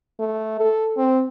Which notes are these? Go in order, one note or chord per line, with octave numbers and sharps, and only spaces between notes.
A3
A4
C4